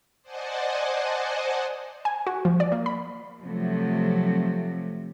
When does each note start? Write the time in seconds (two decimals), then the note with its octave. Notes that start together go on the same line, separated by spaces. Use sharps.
0.23 C5 D5 D#5 F#5 G#5 A5
2.05 G#5
2.27 F#4
2.45 F3
2.60 D5
2.72 A#3
2.86 B5
3.41 C3 F3 F#3 A3 C4